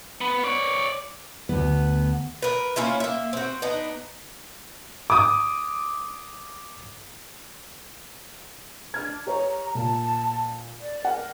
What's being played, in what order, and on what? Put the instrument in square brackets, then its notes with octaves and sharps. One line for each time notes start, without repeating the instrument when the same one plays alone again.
[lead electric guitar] B3
C#5 D5
[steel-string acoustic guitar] D2 B3
[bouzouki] A#4 B4
A#3 C#4 E4 F4
A#3 E5
C4 F#4
B3 D4 D#4
[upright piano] D6 D#6
[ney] D4 [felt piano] F6 G#6
[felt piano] G4 C#5 [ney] A#5
[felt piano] A#2 [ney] A5
[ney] D5
[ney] A#4 [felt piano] F#5